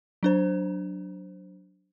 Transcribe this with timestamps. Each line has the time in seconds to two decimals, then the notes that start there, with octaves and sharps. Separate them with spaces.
0.23 F#3 D4 C5